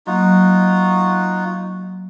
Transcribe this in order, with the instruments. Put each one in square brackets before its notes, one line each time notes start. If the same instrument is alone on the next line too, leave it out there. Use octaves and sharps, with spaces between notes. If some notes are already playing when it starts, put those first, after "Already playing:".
[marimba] F#3 A#3 [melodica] D#4 F4 F#4